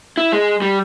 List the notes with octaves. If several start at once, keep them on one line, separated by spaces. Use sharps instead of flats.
E4
G#3
G3